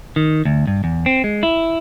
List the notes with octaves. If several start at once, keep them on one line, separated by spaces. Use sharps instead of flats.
D#3
D2
G2
E2
C4
G#3
E4